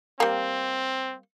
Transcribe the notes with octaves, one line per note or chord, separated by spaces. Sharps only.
G3 A#3 C4